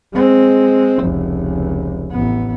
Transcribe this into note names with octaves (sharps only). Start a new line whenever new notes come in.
G#3 C4
F1 C#2
A1 B3